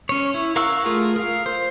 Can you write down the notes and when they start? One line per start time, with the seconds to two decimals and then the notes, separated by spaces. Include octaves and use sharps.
0.09 C#4 C#5
0.34 E4
0.56 A#4 F5 F#5 C#6 E6
0.86 A3 F4 G#4 A#4
1.16 A#4 F5
1.46 C5